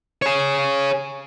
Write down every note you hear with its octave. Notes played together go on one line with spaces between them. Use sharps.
G#4 C#5